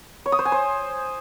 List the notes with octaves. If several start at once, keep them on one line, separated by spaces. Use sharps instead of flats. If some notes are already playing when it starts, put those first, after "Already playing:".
C#5
D#6
C5
G#5
C5